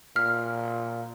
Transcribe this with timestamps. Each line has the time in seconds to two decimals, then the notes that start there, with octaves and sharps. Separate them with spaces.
0.16 A#2 F6